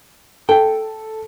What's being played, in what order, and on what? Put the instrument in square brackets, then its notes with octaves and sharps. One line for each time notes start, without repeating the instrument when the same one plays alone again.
[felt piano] A4 [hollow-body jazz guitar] G5